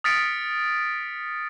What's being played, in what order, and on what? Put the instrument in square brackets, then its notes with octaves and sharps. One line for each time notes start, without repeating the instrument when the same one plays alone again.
[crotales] D#6 F6 A6 B6 C#7 D7